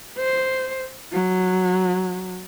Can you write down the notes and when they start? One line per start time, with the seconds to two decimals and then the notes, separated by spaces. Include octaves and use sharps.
0.18 C5
1.13 F#3